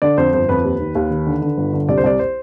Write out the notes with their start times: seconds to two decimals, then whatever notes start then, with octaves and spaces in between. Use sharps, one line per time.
0.02 D3 D5
0.18 F2 C5
0.33 G1 C5
0.49 F2 B4
0.64 D#2
0.80 D#3
0.95 D#2
1.11 D#3
1.27 D3
1.42 D3
1.57 G1
1.73 D3
1.88 C2 D5
1.97 C5
2.04 C2 D5
2.19 C5